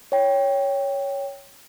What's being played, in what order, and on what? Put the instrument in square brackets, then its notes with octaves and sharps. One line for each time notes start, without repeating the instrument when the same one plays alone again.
[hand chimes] C#5 G5